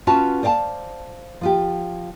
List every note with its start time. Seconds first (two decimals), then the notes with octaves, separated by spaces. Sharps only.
0.07 C#4 F4 F#4 B4 A5
0.43 C5 D5 F5 G5 A5
1.41 F3 F4 G4